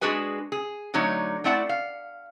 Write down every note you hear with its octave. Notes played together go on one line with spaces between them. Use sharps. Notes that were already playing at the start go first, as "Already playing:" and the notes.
G#3 D4 F#4 G#4 B4 G#5
G#4
D3 F#3 A3 D#4 C#5
A3 C4 E4 D5 F#5 A5
F5